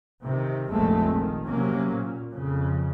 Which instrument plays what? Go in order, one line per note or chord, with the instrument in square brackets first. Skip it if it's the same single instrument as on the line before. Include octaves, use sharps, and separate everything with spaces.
[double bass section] C3 D#3
F1 A#1 A#2 G#3 A3 C4
D#3
C3 F#3 A#3 C#4
A#2
F2 C#3